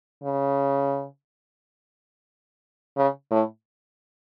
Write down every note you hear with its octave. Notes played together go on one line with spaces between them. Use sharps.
C#3
C#3
A2